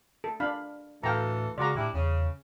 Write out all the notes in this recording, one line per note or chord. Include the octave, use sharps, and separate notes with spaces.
A4
D4 F5 B5
D2 A2 E3 A4 F5 G5 A#5
C#3 G#3 F4 F#4 D5 A#5
A2 G3 D4 E4
E2 C#3